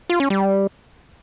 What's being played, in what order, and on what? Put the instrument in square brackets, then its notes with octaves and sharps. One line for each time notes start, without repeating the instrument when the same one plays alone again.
[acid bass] F4
C#4
G3